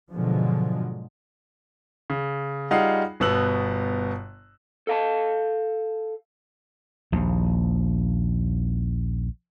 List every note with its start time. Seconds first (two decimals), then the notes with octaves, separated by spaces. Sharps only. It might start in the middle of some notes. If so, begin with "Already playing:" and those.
0.13 G#2 B2 D3 F3 F#3 G#3
2.10 C#3
2.71 G3 D#4 F4 G#4 F#5 C7
3.20 G1 B2 B3 E6 F#6 F#7
4.87 A4 F5 A5
7.12 A#1 D#2